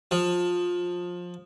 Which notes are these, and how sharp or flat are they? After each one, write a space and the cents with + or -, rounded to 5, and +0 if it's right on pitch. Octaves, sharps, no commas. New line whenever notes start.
F3 +20